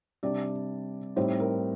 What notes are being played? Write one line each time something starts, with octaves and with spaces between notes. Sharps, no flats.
C3 G3 D4 D5
A2 G3 C4 D#4 C5
A#4